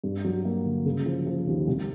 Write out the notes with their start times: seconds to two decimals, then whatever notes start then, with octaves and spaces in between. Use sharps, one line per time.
0.04 G2
0.24 F#3
0.45 A#3
0.65 D3
0.86 C#3
1.06 F3
1.27 F3
1.47 D#2
1.67 C2